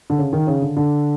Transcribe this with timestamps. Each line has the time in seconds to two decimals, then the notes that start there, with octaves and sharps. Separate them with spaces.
0.10 D3
0.18 C#3
0.33 D#3
0.47 C#3
0.62 D3
0.77 D3